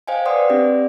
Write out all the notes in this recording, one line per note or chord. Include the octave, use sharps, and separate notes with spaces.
C5 D#5 F5 G5 G#5
B4 D5 F#5 C6 D#6
C4 D4 G4 D5